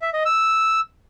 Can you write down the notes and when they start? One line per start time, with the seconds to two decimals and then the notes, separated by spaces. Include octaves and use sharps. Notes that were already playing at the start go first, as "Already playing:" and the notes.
0.02 E5
0.14 D#5
0.25 E6